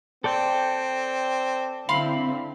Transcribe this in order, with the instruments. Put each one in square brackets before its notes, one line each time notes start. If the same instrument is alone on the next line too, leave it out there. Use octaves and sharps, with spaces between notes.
[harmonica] C4 [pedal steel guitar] A4 D5 G5
[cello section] D3 C4 E4 [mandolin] F5 B5 C6